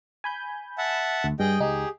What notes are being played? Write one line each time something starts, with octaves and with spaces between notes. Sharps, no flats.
G#5 B5 G6
E5 F#5 A5
D2
G2 G#4 D#5 G5
C#2 D#4 G4 G#4